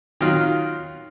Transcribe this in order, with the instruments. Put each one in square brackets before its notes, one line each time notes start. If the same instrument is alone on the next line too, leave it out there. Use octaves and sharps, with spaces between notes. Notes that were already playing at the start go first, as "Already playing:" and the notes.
[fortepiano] D#3 F#3 F4